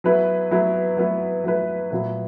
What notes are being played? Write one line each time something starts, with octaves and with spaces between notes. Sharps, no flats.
F#3 B3 E4 B4
F#3 B3 E4 B4
F#3 B3 E4 B4
F#3 B3 E4 B4
A#2 F#3 B3 E4 B4